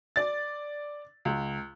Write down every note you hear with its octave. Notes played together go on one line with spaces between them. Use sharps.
D5 A6
C#2